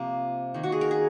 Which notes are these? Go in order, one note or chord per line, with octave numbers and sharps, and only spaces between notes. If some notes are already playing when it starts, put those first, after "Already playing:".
Already playing: C3 F3 A#3 A#4
D#3 A#3
F#4
G#4
A#4
G#4